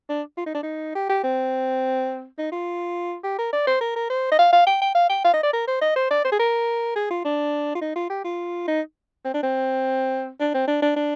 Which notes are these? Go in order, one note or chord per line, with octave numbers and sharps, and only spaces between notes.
D4
F4
D#4
D4
D#4
G4
G4
C4
D#4
F4
G4
A#4
D5
C5
A#4
A#4
C5
D#5
F5
F5
G5
G5
F5
G5
F5
D#5
D5
A#4
C5
D#5
C5
D5
C5
G#4
A#4
G#4
F4
D4
F4
D#4
F4
G4
F4
D#4
C4
D4
C4
D4
C4
D4
D4
D4